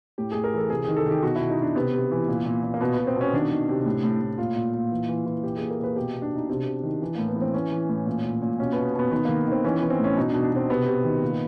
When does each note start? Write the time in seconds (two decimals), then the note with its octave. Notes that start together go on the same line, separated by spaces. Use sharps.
0.18 A2 G4
0.32 A2 G#4
0.44 A#4
0.53 E3 A4
0.70 C3 G#4
0.84 D#3 G#4
0.97 A4
1.06 D#3 G4
1.23 B2 F#4
1.36 E4
1.41 B2
1.50 D#4
1.58 B2 D4
1.75 C3 B3
1.94 C3
2.11 E3
2.29 A#2
2.45 A#2
2.63 A#2
2.74 A#3
2.81 B2 B3
2.94 B2 B3
3.07 C4
3.16 B2 C#4
3.33 D#3 D4
3.51 D#3
3.69 C3
3.86 A2
4.03 A2
4.21 A2
4.38 A#2 F4
4.56 A#2
4.74 A#2
4.91 E3
5.08 E3
5.26 E3
5.43 A#2 G4
5.57 A#2 G#4
5.71 A#4
5.79 A#2 B4
5.96 B2 G4
6.14 B2
6.22 D4
6.31 B2 D#4
6.49 C3 D4
6.66 C3
6.83 D#3
7.02 E3
7.15 A2 A#3
7.28 B3
7.36 E3
7.41 C4
7.53 E3 C#4
7.72 E3
7.89 A2
8.06 A#2
8.24 A#2
8.42 A#2
8.59 B2 C#4
8.73 B2 B3
8.95 B2 B3
9.11 D#3 B3
9.25 D#3 A#3
9.47 D#3 C4
9.64 E3 C#4
9.78 E3 B3
9.90 C4
9.99 A2 C#4
10.16 B2 D#4
10.30 B2 D4
10.43 D4
10.52 B2 C4
10.70 C3 B3
10.86 C3
11.04 D#3
11.22 A#2